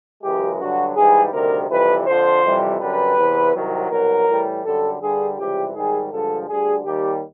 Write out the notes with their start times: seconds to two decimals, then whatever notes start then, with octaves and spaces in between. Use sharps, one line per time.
0.22 F#2 C#3 E3 G#3 G4
0.59 G2 D3 F#3 F#4
0.96 G#2 E3 G3 G#4
1.32 D2 C3 D#3 G3 A#4
1.69 F2 C3 E3 G3 B4
2.07 F2 D3 F3 C5
2.43 F2 C3 E3 G3
2.80 F#2 D3 G3 B4
3.16 E2 C3 E3
3.54 C2 C3 D#3 F#3
3.90 C2 B2 F#3 A#4
4.28 A2 E3 G3
4.64 F#2 D3 G3 A4
5.01 G2 D3 G3 G#4
5.37 C#2 C3 E3 G3 G4
5.74 G#2 D#3 G3 G#4
6.11 G2 D3 F3 G#3 A4
6.48 D2 D3 G3 G#4
6.85 D#2 D#3 G3 G4